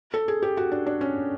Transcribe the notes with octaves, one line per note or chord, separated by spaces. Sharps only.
A4
G#4
G4
F#4
D4
D4
C#4